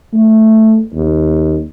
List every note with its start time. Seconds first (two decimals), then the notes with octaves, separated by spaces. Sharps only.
0.13 A3
0.94 D#2